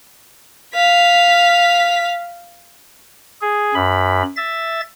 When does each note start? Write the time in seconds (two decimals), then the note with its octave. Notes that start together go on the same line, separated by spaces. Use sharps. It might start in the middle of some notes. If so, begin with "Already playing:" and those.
0.75 F5 B6
3.41 G#4
3.74 F#2 B5
4.36 E5 A6